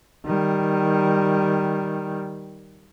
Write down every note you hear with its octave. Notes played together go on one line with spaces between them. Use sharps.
D#3 G3